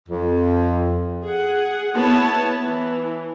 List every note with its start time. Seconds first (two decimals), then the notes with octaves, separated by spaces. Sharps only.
0.08 F2
1.24 G#4 F#5
1.94 B3 E4 C#5 A5
2.62 E3